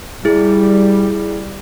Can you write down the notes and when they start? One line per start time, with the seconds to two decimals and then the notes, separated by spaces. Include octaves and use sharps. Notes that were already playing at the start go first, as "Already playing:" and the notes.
0.25 G3 E4 G#4